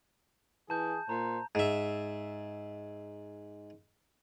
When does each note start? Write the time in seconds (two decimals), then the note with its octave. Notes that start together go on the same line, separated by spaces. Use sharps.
0.70 E3 G#4 A5 G6
1.09 A#2 C5 A#5
1.55 G#2 E5